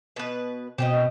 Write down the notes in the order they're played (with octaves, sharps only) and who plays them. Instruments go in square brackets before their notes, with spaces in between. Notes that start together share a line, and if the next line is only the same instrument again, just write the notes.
[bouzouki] B2 B4
[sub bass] B2 [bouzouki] C4 G4 D#5